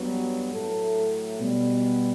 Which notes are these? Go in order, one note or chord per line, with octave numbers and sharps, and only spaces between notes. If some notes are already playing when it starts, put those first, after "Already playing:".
Already playing: G2 F#3 B3
A2 F#3 A3 A4
B2 G3 B3